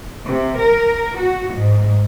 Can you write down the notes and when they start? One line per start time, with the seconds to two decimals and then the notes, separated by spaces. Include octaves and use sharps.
0.25 C3
0.60 A#4
1.17 F#4
1.54 G#2